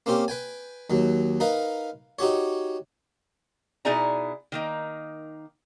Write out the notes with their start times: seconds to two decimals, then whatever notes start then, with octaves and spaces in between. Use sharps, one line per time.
0.06 A#3 C4 C#4 G4 C5
0.28 B4 G5 G#5
0.90 D#2 F#3
1.40 D#4 A#4 B4 F5
2.19 D#4 F#4 G4 C#5
3.85 B2 D#4 E4 G#4 D5 A#5
4.52 D#3 A#3 D#4